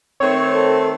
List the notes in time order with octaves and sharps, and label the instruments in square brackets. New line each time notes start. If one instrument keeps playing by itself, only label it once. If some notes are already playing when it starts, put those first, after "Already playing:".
[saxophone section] D#3 A3 C4 [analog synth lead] C#5
[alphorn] A4